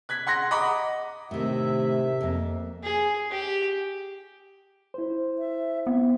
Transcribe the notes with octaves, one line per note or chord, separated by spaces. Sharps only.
F#6 G#6 B6
F#5 C6 F#6 A#6
D#5 F#5 A#5 B5 D6
A2 C3 D#3 E5
F2 A#3
G#4
G4
E4 C5
E5
B3 C4